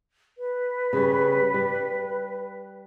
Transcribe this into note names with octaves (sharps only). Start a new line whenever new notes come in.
B4
C#3 G3
G3